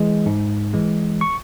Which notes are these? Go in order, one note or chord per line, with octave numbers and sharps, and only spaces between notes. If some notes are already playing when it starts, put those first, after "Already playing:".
Already playing: E3 G#3
G#2
E3 G#3
C#6